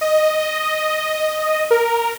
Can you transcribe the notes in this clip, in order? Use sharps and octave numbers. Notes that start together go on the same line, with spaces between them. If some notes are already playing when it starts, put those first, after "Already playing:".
D#5
A#4